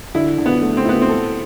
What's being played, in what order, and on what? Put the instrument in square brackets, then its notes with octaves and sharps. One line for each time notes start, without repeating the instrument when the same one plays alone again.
[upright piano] D3 [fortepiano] E4
[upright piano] D3
[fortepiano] B3
[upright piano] A3
[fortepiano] C4
[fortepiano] B3 [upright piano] E4
[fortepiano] C4
[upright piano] A4